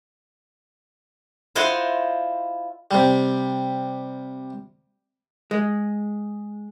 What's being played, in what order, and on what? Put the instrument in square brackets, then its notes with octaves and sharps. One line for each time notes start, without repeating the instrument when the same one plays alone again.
[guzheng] E4 F4 C5 D#5 F#5 C6
[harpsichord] C3 G3
[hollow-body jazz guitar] G#3